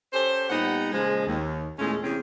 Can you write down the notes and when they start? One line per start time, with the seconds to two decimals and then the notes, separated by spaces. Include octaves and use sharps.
0.13 C#4 G4 A4 C5
0.50 A#2 G3 B3 D#4 F#5
0.92 A#2 C#3 F3 G#3
1.27 D#2
1.79 E2 A#2 G#3 A3 C#4
2.03 E2 C3 C4 C#4